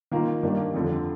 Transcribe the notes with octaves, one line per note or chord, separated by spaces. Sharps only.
D#3 A#3 F4
G2 D#3 A#3 D4
F2 D3 F3